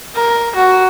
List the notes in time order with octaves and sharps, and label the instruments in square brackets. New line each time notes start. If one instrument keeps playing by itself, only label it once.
[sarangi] A#4
F#4